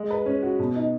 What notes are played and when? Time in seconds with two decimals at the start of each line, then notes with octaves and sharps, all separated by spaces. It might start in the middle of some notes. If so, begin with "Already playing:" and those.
Already playing: G#3
0.11 B4
0.26 C#4
0.42 F#4
0.59 B2
0.75 D#4